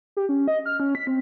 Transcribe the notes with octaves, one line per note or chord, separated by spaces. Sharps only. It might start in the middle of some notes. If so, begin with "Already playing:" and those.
G4
C#4
D#5
F6
C#4
B6
C4